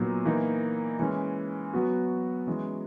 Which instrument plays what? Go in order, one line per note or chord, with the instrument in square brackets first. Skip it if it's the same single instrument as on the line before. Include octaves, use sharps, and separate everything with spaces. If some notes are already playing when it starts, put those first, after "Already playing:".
Already playing: [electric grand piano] A#2 F#3 B3 D#4
E3 A#3 D#4
E3 G#3 C#4
F#3 B3 F#4
E3 G#3 C#4